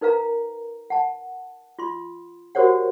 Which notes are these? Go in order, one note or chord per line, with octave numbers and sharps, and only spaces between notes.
D#4 A#4 B4 F5 A#5
F#5 A5
F4 C6
F#4 G4 A#4 C5 C#5 F#5